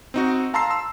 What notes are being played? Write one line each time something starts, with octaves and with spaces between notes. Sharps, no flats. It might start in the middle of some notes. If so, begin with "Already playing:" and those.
C4 D#4 F#4
F5 A5 A#5 C6 E6 C7
E6